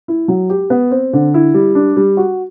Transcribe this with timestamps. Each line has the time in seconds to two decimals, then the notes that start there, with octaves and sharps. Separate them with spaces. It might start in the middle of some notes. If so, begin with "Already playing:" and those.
0.08 E4
0.28 F#3
0.50 G4
0.70 B3
0.91 C4
1.13 D3
1.34 E4
1.54 G3
1.75 D4
1.97 G3
2.17 F#4